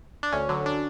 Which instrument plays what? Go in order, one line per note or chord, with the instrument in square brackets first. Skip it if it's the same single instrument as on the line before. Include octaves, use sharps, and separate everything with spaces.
[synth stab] D4
D2 C#4
D3 F#3
D4